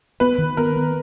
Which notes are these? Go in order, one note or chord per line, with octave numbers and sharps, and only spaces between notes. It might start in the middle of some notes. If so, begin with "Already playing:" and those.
B3 B4
D#3
B3 A#4
B3